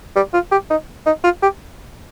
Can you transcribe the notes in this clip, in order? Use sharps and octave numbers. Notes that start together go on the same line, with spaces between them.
G3
F4
G4
D#4
D#4
F4
G4